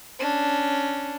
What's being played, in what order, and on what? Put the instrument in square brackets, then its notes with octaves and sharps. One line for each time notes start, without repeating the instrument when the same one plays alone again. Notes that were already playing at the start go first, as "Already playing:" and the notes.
[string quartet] C#4 D4